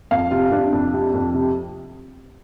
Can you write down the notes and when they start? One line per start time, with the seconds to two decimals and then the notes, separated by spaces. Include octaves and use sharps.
0.11 F2 F5
0.31 C3 F4
0.51 C3 D4
0.72 F2
0.93 C3
1.14 F2
1.34 C3